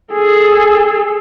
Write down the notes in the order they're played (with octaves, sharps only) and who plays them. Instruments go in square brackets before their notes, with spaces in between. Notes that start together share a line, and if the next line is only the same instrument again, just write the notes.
[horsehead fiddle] G#4 A4